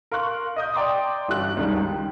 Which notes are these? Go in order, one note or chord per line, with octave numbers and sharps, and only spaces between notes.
A#4 F5 C6 C#6 F#6
D#5 D#6 G6
D5 G5 A#5 C6 D6 D#6
G1 E3 C#4 F#4 F#6
C#2 G2 D#3 G3 G#3
G5